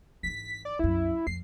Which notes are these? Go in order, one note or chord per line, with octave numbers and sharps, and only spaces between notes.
G#1 E3 B6
D5
C2 F#2 E4
F2 C7